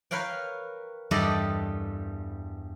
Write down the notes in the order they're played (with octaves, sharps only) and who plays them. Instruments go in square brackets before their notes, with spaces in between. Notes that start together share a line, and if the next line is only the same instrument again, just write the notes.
[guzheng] A#4 B4 C#5 F5 G5
E2 G2 G3 G4 A4 D#5